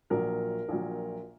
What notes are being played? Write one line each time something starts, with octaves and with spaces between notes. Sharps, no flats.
A#1 A#2 F#3 A#4
A#1 A#2 F#3